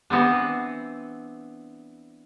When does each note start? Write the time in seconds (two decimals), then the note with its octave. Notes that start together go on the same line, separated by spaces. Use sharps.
0.10 E3 B3 C4 D4